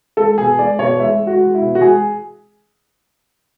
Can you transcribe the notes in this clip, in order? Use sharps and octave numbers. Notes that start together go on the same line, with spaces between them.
G#3 A4
B2 G#4
G#3 D5
B2 C#5
G#3 E5
G#3
F#4
G#3
E4
B2
F#4
G#3 G#4